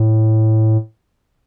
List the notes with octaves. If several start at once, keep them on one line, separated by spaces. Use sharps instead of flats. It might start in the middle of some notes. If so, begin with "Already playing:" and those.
Already playing: A2